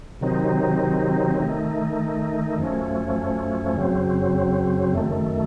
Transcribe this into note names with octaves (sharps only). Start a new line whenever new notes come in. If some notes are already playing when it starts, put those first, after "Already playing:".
C3 D#3 F#3 C4 D#4
D#3 A3 D#4
F#2 F3 A3 C#4
F#2 C#3 F#3 C4
F#2 D#3 A3